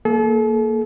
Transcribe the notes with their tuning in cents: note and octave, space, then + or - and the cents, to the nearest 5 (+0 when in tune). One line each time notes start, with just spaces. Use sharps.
A#3 -5 A4 -40